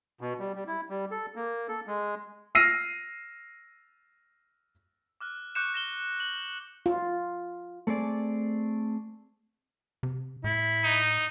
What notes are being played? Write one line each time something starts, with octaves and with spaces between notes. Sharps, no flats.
B2
G3
G3
E4
G3
A4
A#3
A4
G#3
E6 F6 A#6 C7 D#7
D6 F6 F#6
C#6 D6 F#6 G6 C#7 E7
A#6 E7 G7
F#7
F4
A3 C4 G#4 D5
C3
A2 E4
D#4